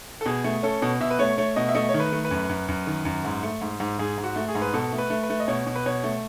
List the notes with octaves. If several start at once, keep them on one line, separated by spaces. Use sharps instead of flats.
A4
B2 G#4
A3
C#4 A4
B2
B2 E5
B4
A3 C#5
A3 C#5
B2 D#5
E5
A3 D#5
C#5
D#3
B4
A3
B4
F#2
F#2
F#2
D#3
F#2
G#2
A3
G#2
G#2
G#2 G#4
G#2
F#4
A3
G#4
G#2
B4
B2 A4
A3
B4
A3
B4
A3
D#5
B2 C#5
B2
B4
B2 C#5
A3